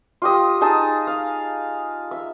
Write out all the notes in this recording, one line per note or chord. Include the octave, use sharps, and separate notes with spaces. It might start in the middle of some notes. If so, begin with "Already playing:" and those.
F4 G4 D#5
D#4 G#4 D#5 A5
F5
E5